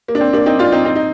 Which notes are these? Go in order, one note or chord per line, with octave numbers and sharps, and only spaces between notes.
A#3
D4
C4
A#3 D4
C4 D#4
D4 F4
C4 D#4
C4 D#4
D#4